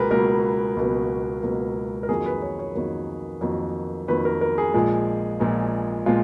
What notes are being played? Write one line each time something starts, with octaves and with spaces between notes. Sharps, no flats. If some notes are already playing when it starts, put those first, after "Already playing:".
Already playing: C#2 B2 F#3 A#3 G#4 A#4 B4
C#2 B2 F#3 A#3 A#4
C#2 B2 F#3 A#3
C#2 B2 F#3 A#3
A#4
F2 D#3 F#3 A#3 G#4
B4
C#5
C#5
F2 D#3 F#3 A#3
F2 D#3 F#3 A#3
F2 D#3 F#3 A#3 B4
A#4
A#4
G#4
A#1 A#2 F3 G#3
A#1 A#2 F3 G#3
A#2 F3 G#3 F4